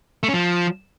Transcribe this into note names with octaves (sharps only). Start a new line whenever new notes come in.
A3
C#4
F3